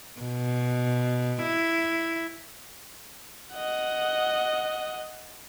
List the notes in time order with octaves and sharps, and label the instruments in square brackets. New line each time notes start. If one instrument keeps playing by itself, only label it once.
[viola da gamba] B2
E4
[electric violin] D#5 F#5